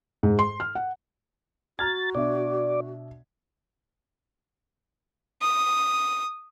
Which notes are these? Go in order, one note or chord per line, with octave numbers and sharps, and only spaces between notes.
G#2
C6
F6
F#5
F#4 A#5 F6 G#6 A6
B2 D4 D5 E5
D#6